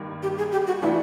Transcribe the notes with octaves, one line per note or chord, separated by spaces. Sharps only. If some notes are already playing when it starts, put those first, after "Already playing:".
Already playing: G2 D#3 A#3
G4
G#4
G4
F#4
E3 A3 D4 E4 F4